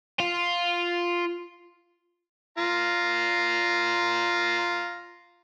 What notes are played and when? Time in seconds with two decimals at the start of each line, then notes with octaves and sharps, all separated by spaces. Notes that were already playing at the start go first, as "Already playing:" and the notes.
0.20 F4
2.58 F4 A#5